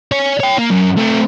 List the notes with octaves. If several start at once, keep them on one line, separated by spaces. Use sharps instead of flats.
C#5 G#5
C#5 G5
A#3
F#2
A3 C4